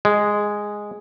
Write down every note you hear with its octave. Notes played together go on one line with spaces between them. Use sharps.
G#3